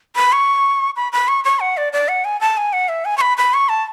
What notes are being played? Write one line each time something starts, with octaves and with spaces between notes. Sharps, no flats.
B5
C#6
B5
B5
C#6
C#6
F#5
D5
D5
F#5
G#5
A5
G#5
F#5
E5
G#5
C#6
B5
B5
C#6
A5